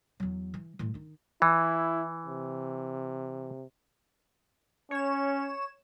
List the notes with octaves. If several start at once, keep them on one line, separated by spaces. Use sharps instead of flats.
E2 F#3
E3
A2 E3
D#3 D#4
E3 E4
C3
C#4 C#5 E7